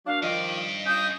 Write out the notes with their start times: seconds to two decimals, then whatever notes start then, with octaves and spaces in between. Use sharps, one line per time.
0.07 F#3 A#3 D4 F5
0.23 G2 D#3 F3 D5 D#5
0.86 C#4 F4 D#5 D#6 G6